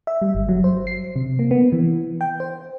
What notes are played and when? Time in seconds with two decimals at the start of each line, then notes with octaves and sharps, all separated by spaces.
0.07 E5
0.22 G3
0.35 G1
0.49 F#3
0.64 C5
0.87 C7
1.16 C3
1.39 A#3
1.51 B3
1.72 E3
2.21 G5
2.40 C5